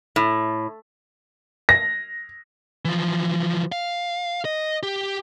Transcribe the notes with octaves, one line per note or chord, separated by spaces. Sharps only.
A2
A#6
E3 F3
F5
D#5
G4